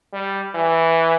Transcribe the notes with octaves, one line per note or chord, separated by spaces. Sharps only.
G3
E3